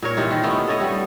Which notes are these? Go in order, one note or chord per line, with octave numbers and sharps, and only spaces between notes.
A#2 A#4 C#5
C3 E3 D#4 F4
D#3
A3 B3 C#4
A4 C#5 D#5
G3 A3 B3